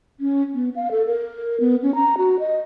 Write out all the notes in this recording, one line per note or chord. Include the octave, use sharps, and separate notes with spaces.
C#4
B3
F5
A4
A#4
B3
C#4
A#5
F#4
D#5